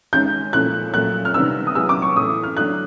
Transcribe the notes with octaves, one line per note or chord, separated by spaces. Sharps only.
D#3 G#3 C#4 G6
A#2 F3 A3 C#4 E4 F#6
A#2 F#3 A3 F#6
F6
C3 D#3 G3 B3 D4 E6
D#6
F#3 B3 E4 G#4 E6
D6
C#6
A2 E3 A3 D#6
F6
D3 F#3 A3 D4 F#6